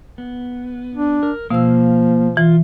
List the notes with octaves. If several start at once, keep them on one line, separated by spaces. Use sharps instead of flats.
B3
D4
A#4
B2 F3 A#3 F5 E6
E3 F4